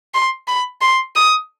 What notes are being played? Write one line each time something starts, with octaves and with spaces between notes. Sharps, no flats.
C6
B5
C6
D#6